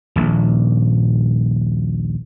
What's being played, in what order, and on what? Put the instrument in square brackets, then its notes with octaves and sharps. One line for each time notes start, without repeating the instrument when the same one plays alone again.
[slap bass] D#1 A#1